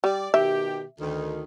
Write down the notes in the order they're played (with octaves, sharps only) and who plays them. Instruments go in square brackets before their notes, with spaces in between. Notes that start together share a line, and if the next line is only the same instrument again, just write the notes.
[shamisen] G3 [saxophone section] D5
[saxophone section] B2 D#3 G4 [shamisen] E5
[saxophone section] D2 D#3